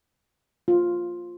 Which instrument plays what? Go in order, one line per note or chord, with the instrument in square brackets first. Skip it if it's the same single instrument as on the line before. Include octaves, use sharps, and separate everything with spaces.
[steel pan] F4